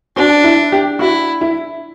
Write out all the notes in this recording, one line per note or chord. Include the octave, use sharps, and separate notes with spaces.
D4 F#4
E4
G4
E4 F#4
E4